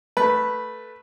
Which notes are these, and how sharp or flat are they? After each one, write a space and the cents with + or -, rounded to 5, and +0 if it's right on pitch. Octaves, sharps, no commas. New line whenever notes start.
A3 +0 B4 -5